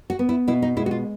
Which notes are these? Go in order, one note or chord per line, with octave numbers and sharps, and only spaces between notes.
F#4
B3
E4
B2 E4
D#4
G#3 E4
F#4
F4